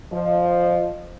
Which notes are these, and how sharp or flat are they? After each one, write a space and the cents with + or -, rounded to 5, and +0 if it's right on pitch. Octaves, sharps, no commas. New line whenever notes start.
F3 +0 D#5 -25